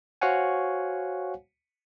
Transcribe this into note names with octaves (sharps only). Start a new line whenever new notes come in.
F#4 C5 C#5 F5 F#5 G#5